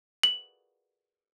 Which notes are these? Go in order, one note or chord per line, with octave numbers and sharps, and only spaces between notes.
F#7